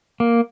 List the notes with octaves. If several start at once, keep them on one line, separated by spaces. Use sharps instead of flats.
A#3